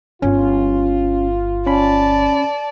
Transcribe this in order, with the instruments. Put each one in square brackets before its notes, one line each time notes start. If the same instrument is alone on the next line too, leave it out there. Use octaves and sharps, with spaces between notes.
[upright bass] G1 [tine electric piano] C#4 [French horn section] F4
[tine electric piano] C#4 B5 [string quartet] D5 A5